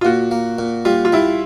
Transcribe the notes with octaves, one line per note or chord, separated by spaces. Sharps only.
F4
A#2 F#4
A#3
A#2
G3 F4
F4
G3 E4